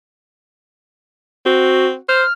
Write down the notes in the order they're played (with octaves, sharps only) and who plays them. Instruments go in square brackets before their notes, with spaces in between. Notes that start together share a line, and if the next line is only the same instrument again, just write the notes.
[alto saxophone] C4 [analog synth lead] F#4
[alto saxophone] C5 [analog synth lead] F6